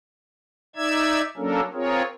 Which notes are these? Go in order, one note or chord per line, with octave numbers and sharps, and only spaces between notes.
D#4 D5 E5 E6 G#6
F#3 A#3 C#4 D4 A4 A#4
C4 F4 G#4 A#4 C#5